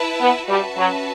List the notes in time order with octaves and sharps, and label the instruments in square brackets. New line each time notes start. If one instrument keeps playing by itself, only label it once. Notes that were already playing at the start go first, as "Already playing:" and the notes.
Already playing: [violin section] E4 B4 E5 A5
[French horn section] B3
[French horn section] G3 [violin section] C#4 F#4 B4 E5 A5
[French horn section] F#3